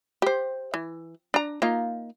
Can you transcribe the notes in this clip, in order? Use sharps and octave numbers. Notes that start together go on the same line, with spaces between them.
G4 C5
E3
D4 A#5
A#3 D#4 F4